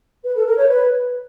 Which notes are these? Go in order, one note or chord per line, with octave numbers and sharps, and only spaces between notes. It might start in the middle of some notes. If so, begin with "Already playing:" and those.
B4
A4
A#4
C#5
B4